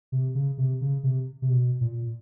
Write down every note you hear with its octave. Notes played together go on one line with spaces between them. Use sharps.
C3
C#3
C3
C#3
C3
C3
B2
A#2